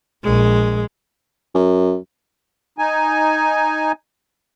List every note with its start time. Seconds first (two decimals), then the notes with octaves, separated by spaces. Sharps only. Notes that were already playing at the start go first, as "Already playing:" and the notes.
0.24 A#1 G#3
1.55 F#2
2.79 D#4 G#5